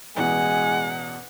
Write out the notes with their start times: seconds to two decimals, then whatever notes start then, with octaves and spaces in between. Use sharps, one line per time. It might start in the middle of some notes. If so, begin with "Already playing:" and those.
0.17 A1 E2 B2 G#3 F#5 G#5